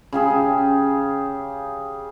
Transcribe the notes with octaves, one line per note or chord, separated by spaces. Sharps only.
C#3 G4 G#4